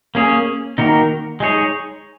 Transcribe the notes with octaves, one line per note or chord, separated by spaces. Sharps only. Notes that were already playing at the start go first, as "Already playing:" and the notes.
A#3 C#4 G#4 C#5
D#3 A#3 D#4 F#4 A#4
G#3 D#4 G#4 C#5